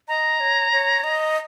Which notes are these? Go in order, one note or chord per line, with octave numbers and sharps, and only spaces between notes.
D#5 A#5
C#5
C#5
D#5